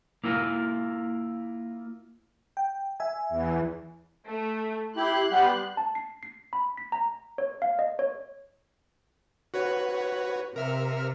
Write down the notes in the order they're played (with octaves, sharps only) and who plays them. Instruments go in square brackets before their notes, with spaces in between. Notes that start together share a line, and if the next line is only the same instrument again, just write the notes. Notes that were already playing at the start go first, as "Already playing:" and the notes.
[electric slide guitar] A#3 E4 F4 A#4
[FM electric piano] G5
E5 G#5
[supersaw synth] E2 E3
[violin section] A3
[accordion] E4 G4 [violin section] C6 F#6
[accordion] G3 B3 G4
[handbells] A5
C7
C7
B5
B6
A#5
C#5
F5
D#5
C#5
[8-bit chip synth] F#4 B4 C#5
[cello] C3 [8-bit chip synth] A#4 E5 F6